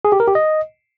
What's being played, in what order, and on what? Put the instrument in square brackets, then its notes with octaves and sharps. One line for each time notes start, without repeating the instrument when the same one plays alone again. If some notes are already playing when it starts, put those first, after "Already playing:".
[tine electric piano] G#4
G4
A#4
G4
D#5